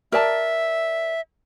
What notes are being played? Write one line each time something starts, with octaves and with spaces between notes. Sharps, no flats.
A#4 D5 E5 A5